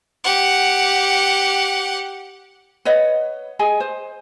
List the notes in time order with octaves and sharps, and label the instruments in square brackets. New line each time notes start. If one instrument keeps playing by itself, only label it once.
[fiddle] G4 F#5
[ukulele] B4 C#5 D#5 F#5
G#4 D#5 G#5
C5